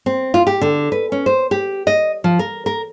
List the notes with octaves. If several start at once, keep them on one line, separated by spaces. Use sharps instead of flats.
C4
F4
G4
D3
B4
C#4
C5
G4
D#5
F3
A#4
A#4